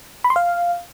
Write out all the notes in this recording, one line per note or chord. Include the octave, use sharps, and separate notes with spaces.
B5
C6
F5